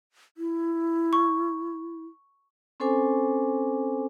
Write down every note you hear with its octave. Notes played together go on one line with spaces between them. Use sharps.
E4
C#6
C4 C#4 A4 C5 G#5 D6